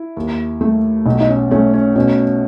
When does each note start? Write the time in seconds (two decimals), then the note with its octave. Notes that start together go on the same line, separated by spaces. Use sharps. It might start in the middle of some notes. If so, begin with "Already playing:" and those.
Already playing: E4
0.17 D#2
0.61 A3
1.06 B1 D#4
1.20 D#4
1.28 C#4
1.51 A3 C#4
1.74 C#4
1.96 B2 C#4